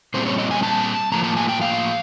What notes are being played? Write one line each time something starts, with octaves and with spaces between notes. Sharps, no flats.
A#2 G3 C4 C5
C#5
D#5
G#5
A5
A2 F3 A#3 A#5
A5
G#5
G5
F5